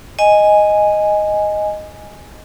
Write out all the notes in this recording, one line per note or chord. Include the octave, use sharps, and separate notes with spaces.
D#5 G#5